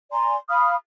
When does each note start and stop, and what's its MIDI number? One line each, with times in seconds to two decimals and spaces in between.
0.12 0.36 74
0.12 0.36 80
0.12 0.36 82
0.12 0.36 84
0.49 0.75 77
0.49 0.75 83
0.49 0.75 87
0.49 0.75 89